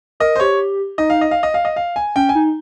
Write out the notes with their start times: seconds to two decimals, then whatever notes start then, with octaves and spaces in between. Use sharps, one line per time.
0.20 A#4 D#5
0.36 C5
0.40 G4 C#5
0.98 D#4 D#5
1.10 F5
1.21 D#5
1.31 F5
1.43 D#5
1.54 F5
1.65 D#5
1.76 F5
1.96 G#5
2.16 C#4 G5
2.29 G#5
2.35 D#4